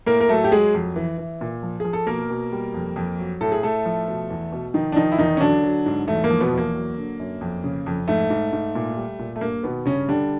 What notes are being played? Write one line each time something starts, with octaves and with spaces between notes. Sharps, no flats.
A2 A#3 A#4
A#4
F#3 A3 A4
G4
F#3 G#3 G#4
F2
E3
E3
A#2
F3
F3 G#4
A4
B2 A#3 A#4
B2
G3
F2
F2
F#3
A2 A4
G#4
A2 A3 A4
F3
B2
E2
B2
D#3 F3 D#4
D4
D#3 F3 D#4
E4
E2 D#3 D#4
C#4
D3 F#3 D4
F#3
G#2
E2 A3
A#3
F3
B2 B3
E2 A#3
F#3
D3
F#2
F2
C#3
F2
G#2 A3
G#2
G#2
A#2
G3
A#2
A3
G2 A#3
B2 D#3 B3
G2 C#3 C#4
D3 G3 D4